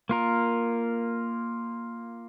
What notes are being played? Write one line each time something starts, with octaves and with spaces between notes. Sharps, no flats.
A#3 F4 A#4